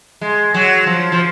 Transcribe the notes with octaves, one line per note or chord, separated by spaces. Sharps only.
G#3
F#3
F3
F3